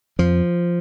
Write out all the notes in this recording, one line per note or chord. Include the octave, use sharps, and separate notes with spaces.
F2 F3